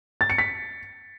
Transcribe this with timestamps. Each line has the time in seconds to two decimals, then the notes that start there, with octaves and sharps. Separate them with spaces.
0.21 A6
0.30 C#7
0.38 B6